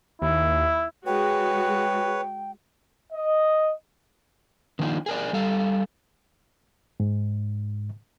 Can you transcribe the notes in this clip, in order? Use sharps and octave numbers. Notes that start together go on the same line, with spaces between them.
D#2 E4
G#3 F#4 B4 C#5 G5
D#5
D3 D#3 F3 A#3 D4 D#4
G#4 A#4 D5
G3 A4 F5
G#2